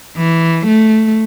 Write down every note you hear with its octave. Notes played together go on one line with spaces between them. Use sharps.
E3
A3